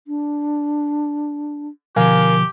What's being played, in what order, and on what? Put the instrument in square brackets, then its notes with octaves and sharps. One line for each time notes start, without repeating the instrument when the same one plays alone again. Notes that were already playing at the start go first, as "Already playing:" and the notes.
[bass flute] D4
[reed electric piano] B2 D3 F3 [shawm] G4 [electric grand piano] A#4 F5 G#5